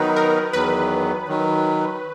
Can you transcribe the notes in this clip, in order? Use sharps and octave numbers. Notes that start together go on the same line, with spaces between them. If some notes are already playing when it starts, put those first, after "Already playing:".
Already playing: D#3 F#3 B3 D#4 A#4 B4
A#4
E2 D#3 F#3 B3 B4
D#3 F#3